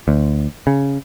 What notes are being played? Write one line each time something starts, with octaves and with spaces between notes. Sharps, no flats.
D2
C#3